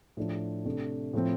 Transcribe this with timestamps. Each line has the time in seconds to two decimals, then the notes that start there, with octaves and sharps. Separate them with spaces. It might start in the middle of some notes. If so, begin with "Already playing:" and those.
0.17 A2 F3 D4
0.65 C3 A3 D4
1.13 A2 F3 C4